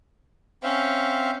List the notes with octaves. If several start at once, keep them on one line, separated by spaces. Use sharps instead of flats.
C4 C#4 E5 F5